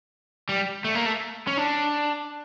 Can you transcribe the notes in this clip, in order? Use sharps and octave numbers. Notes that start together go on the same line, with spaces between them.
G3
A3
A#3
A3
C#4
D4